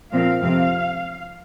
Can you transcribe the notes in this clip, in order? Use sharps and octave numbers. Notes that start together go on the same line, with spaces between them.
A#2 F3 C4 F5
F2 C3 F3 C4 F5